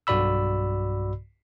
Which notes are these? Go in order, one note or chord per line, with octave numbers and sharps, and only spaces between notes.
B1 G2 F#4 D5 B5 E6